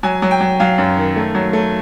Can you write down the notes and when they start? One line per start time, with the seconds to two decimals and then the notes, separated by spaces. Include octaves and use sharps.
0.03 F#3 G#5
0.22 F#3
0.31 G5
0.41 F#3
0.60 F#3 F5
0.78 F#2
0.97 D#3
1.16 A3
1.35 F#3
1.53 A3